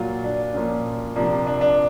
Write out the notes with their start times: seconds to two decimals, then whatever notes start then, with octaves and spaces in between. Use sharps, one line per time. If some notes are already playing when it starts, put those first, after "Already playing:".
Already playing: A#2 F#3 A#3 F4
0.24 D4
0.54 A#2 F3 A#3 C#4
1.16 C3 F3 A#3 D4
1.47 D4
1.61 D4